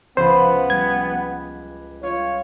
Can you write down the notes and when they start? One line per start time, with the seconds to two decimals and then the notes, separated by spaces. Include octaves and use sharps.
0.17 C#2 F3 B3 B4 C5
0.70 G3 G#6
2.03 F4 C#5